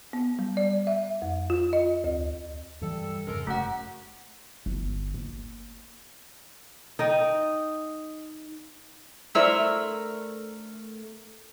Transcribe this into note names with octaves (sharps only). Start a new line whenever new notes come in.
B3
G3
D5
E5
F2
F4
D#5
D2
G2 E3 G3 A4
F2 G#2 C#3 G#3 A4 A#4
F#1 C#3 A3 F#4 F#5
G1
A#3
D#4 D#5 G5
A3 D4 E4 A#4 C5 E6